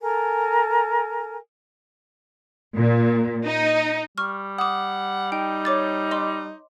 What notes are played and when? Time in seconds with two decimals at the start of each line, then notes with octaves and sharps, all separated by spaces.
0.01 A4 A#4 G#5
2.75 A#2
3.47 D#4
4.18 G3 C#6 F6
4.59 F#5 D6 D#6
5.32 D#4 G5
5.65 C#5 D6 A6
6.11 D#5 C6 D6